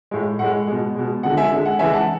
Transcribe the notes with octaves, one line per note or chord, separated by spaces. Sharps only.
A2 G#3
A2 G#3 F#5
B2 G#3
B2 G#3
D3 G#3 F#5
E5 G#5
D3 G#3
F#5
C#3 E3 G#3 E5 G#5
F#5 A5